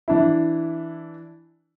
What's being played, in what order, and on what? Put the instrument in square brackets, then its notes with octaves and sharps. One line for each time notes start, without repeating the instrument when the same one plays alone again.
[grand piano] E3 D4 E4